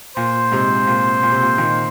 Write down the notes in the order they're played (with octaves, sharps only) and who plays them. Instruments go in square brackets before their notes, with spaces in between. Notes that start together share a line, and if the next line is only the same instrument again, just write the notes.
[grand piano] A#2 [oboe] C5
[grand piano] G#2 C3
A#2
A#2
C3
A#2
A#2 D#3